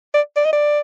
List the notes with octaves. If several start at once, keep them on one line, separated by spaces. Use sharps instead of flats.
D5
D5
D#5
D5